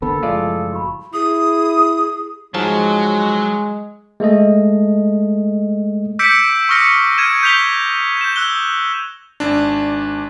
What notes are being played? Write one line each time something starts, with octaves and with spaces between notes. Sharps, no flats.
D3 A#3 B3 A4 B5
F#1 A2 F3 G#3 F4 D5 F5
F#4 G4 B5
E4 G#4 D#6
G#2 F3 F#3 G#3 A5
G#3 A3 A4 D#5
D6 E6 G6 B6 C#7 D7
C#6 D#6 F6 A#6 C#7
F6 G#6 D#7 E7
G6 B6 F7 G7
G6 E7
E6 F#6 G7
G#1 D4